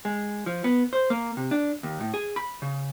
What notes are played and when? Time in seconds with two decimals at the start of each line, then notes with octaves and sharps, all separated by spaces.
0.05 G#3
0.46 F3
0.64 B3
0.93 C5
1.10 A#3
1.37 C3
1.51 D4
1.83 D#2
2.00 A2
2.14 G#4
2.36 B5
2.62 C#3